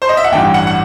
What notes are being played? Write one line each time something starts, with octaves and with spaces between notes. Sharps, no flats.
C5
D#5
E5
F#5
A1 G2 E3 G5
F#5
F#5